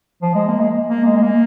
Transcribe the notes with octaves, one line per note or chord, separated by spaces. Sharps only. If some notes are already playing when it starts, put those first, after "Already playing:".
F3
G#3
A#3
G#3
A#3
G#3
G#3
A#3